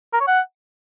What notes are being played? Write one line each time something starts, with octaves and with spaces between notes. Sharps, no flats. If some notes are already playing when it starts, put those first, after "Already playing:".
A#4
C#5
F#5